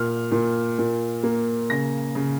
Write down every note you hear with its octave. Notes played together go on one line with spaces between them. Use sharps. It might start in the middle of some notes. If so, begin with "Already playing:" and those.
Already playing: A#2 F6
A#2
A#2
A#3
C#3 A#6
C#3